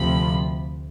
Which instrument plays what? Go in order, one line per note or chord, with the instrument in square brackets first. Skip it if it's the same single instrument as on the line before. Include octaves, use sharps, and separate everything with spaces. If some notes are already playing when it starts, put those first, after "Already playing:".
Already playing: [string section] D2 C3 F3 B5